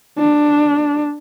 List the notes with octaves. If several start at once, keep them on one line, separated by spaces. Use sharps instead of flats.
D4